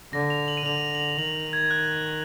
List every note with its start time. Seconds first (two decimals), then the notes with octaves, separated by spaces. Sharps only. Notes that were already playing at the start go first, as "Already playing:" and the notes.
0.13 D3 A#6
0.30 F7
0.48 F#7
0.57 D#7
0.65 D3 F7
0.95 F#7
1.00 F7
1.18 D#3 F#7
1.53 G#6
1.71 F#6